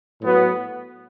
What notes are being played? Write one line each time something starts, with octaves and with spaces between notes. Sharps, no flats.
A2 F#3 B3 F#4